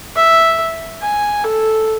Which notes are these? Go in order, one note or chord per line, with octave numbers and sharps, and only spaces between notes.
E5
G#5
A4